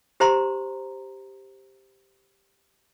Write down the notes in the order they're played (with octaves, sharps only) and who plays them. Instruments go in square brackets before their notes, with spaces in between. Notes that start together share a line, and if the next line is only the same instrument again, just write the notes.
[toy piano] G4 C5 A#5 C6